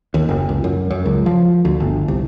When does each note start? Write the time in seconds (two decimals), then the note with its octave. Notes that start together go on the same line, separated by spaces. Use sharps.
0.14 D#2
0.29 F#1
0.49 C#2
0.64 F#2
0.91 F#2
1.06 C#2
1.26 F3
1.65 D2
1.80 G1
2.08 C2